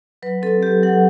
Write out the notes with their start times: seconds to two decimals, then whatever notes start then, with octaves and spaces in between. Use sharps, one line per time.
0.22 F#3 B4
0.42 C4 A4
0.63 F#3 G4
0.83 F#3 F#5